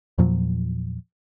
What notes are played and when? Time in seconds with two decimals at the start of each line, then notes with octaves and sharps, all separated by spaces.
0.18 E2 A#2 F3 F#3